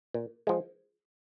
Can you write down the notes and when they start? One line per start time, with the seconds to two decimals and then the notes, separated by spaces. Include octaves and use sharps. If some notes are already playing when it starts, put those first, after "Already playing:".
0.14 A#2
0.47 F3 G#3